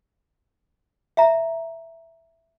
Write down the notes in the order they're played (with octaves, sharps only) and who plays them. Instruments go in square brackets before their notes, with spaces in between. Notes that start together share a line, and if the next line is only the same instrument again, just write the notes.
[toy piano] E5 F5 A#5